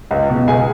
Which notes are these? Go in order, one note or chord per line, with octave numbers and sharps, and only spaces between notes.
C#2
B2
C#2 G#4 G#5